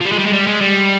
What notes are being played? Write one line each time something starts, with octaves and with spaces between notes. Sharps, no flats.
F3
G3
G#3
G3
G#3
G3
G#3
G3